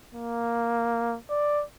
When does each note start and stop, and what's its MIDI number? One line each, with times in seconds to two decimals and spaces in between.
0.13 1.16 58
1.30 1.63 74